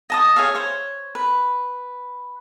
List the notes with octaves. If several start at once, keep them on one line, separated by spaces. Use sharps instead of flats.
D#5 A5 D#6
G#4 C#5 E5 F5
C5 C#5
B4